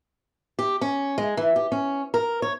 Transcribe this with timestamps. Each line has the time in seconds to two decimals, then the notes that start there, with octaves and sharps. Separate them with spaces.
0.59 G4
0.81 C#4
1.18 G#3
1.37 E3
1.56 G4
1.72 C#4
2.14 A#4
2.42 C#5